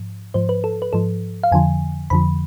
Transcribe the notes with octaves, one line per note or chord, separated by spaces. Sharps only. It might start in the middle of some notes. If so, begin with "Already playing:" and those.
Already playing: G#2 F3
G#2 F3 C5
B4
A4
B4
G#2 F3 A4
F5
F2 D3 F3 G#5
F2 D3 F3 B5